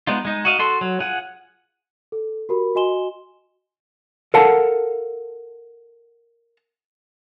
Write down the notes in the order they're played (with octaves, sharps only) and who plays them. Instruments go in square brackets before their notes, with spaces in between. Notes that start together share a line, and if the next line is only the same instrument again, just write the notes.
[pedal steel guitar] G#3 B3 D#4 F4
G#3 D#4
F#4 D#5 F5
F#4 A4 C6
F#3
F4 G#4 F#5
[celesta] A4
F#4 G4 A#4 B5
F#4 D#5 G#5 C6 E7 G7
[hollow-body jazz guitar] A4 A#4 F5 F#5 A5